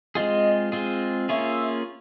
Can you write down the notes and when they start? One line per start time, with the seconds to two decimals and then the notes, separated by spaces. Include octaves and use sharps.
0.15 G#3 C4 F4 G#4 D#5
0.72 G#3 C4 F4 G#4
1.29 A#3 C#4 F4 G#4 C#5 E5